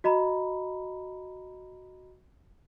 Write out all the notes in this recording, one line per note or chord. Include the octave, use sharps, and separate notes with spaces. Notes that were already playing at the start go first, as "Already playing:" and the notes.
F#4 D#5 A#5 B5